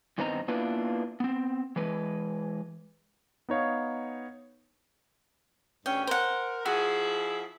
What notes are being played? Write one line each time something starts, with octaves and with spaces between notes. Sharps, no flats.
G2 D#3 B3 C4 D#4 A#5
A#3 B3 D4 E4 F4 B4
B3 C4
E3 G#3 B4
B3 D#4 C#5 F5
D2 G2 C#4 G5
A#4 C5 F#5
F3 E4 F#4 G#4